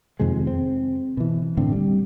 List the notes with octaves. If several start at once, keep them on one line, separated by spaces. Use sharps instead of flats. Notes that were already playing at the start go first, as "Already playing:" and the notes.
F2 C3 D#3 G#3
C4
B2 E3
A2 D3 A3 C4
G3